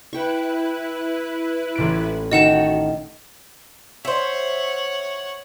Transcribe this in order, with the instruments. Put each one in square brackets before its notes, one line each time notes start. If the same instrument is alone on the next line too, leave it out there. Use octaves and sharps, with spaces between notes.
[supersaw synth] E4 B4 F#6 [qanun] G5 C#6
[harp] A1 A#2 D7
[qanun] D#3 A#4 A5 [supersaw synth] F#4 [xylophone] D#5 F#5 E7
[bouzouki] C5 E5 [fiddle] C#5 F#5